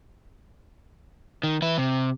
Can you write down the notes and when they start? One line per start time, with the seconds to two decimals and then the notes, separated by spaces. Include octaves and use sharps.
1.43 D#3
1.62 E3 E4
1.78 C3